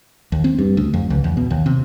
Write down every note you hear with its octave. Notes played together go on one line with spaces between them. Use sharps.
D#2
C4
G2
D2
F2
C#2
E2
B2
D#2
C3